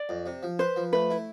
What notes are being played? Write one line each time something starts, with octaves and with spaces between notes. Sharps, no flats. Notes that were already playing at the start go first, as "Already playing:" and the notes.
Already playing: D5
F2
C3
F3
B4 C5
F3
A3 B4
E4